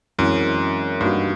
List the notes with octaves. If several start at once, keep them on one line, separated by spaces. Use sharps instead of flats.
F#2 E3 G#3 C4 E4
G2 G3 A#3 D#4 F#4